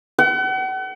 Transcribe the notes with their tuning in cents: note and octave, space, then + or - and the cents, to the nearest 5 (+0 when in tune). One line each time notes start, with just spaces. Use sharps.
F#5 +40